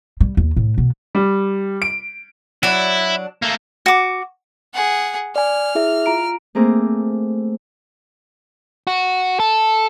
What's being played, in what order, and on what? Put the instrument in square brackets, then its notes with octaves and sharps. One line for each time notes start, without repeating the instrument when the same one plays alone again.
[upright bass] G3
D#2
A2
B2
[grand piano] G3
D7
[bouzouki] F#3 D4 [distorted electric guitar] E4
[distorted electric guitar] A3 A#3
[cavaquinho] F#4 D6
[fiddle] G#4 F#5
[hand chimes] D5 G#5 [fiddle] F6
[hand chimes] E4 G#4 E5
F4 A#5 D7
[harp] A3 A#3 C4 G#4 A#5 D6
[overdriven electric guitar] F#4
A4